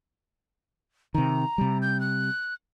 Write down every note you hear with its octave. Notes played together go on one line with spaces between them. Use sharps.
C3 D#3 A#5
C3 G3
G6
F#6